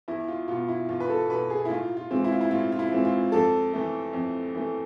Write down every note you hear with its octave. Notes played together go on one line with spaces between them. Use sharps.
E2 E4
F4
B2 B3 F4
E4
E2 F4
B4
A4
B2 B3 B4
G#4
E4
A2 F4
F4
E3 G#3 C4
E4
F4
E4
A2 F4
F4
E4
E3 G#3 C4
F4
F2 A4
E3 A3
F2
E3 A3